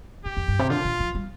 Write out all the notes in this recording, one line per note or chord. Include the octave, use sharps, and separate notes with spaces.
A2 G4
F2
G2
C3
D3 F4
A#2
F3
G3